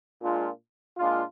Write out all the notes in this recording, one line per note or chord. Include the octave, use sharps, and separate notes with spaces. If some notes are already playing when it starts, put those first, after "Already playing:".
A#2 G#3 D4 F4
A#2 G#3 D4 F4